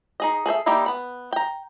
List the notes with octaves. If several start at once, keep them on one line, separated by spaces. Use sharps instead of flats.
D#4 G#4 D#5
G#4 A4 C5 E5
G3 A#3 D#4 E4 G4
B3 B5
G5 A#5